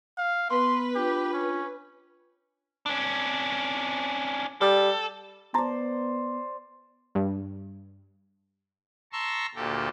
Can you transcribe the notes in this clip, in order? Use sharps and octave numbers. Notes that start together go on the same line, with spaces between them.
F5
B3 B4 C6
D4 F4 G4
C#4
C#4 D4
G3 A4
B3 C5 D5 A5 A#5 A6
G2
A5 A#5 C6 C#6 E6
D2 A#2 G4 A4